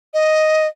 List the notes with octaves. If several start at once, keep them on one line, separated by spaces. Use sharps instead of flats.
D#5